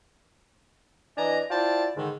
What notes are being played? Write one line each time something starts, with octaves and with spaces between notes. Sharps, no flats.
E3 D4 D#5 G#5 A#5
E4 F4 C5 D5 G5 A5
G#2 D3 D#3